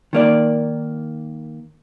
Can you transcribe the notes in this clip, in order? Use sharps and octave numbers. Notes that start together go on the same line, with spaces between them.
D#3 A#3 D5